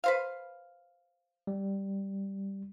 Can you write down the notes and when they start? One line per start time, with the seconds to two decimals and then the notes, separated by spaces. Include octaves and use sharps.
0.04 B4 C5 F5
1.47 G3